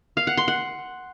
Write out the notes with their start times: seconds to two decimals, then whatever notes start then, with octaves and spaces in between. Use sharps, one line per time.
0.17 F5
0.27 F#5
0.37 C6
0.48 F#5